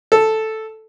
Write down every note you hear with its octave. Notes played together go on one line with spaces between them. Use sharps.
A4